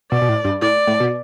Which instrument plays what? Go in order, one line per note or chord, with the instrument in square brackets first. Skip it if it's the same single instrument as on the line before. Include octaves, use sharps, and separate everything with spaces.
[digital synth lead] B2 [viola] D5
[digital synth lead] B2
A2
G2
[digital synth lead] A2 [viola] D5
[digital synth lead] A2
B2